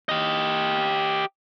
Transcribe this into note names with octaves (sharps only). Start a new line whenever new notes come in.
G4 D#5